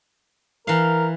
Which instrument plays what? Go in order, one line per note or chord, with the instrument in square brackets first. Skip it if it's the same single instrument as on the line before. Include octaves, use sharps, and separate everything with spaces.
[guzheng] E3 F5 [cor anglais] A#4